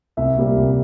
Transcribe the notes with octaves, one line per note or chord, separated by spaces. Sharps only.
C2 E5
A#2 G3 A#3
C2